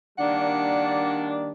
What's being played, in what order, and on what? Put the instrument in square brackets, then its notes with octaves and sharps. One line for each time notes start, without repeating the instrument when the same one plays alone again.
[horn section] D#3 G3 A#3 D4 [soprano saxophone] F#5